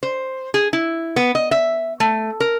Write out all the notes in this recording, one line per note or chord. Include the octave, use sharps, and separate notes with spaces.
C5
G#4
E4
B3
D#5
E5
A3
A#4